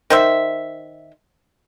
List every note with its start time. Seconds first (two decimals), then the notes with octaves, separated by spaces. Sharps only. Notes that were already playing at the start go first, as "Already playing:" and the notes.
0.10 D#3 C5 E5